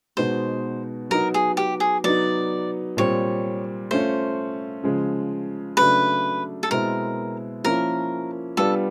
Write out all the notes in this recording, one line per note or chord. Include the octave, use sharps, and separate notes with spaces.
B2 G#3 B3 D#4 F#4 C5
F#3 B3 D#4 F#4 A#4
G#4
G4
G#4
F#3 B3 D#4 D5
A#2 G3 C4 C#5
A3 C#4 F4 C5
C#3 F3 G#3
C#3 F#3 A3 D4 B4
A4
B2 G#3 C4 E4 A#4
F3 A#3 C#4 E4 A#4
G3 B3 D4 F4 A4